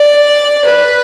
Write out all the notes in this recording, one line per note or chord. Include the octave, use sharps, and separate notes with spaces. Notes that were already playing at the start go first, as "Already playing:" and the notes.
Already playing: D5
B4